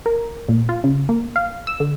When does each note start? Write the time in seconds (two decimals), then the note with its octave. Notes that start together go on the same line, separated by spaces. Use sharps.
0.06 A#4
0.49 A#2
0.69 F4
0.84 C#3
1.09 A#3
1.36 F5
1.67 E6
1.80 D3